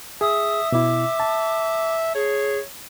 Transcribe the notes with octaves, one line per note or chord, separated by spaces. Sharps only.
G#4 E5 D#6
B2 E4 D6
A5
G#4 C#5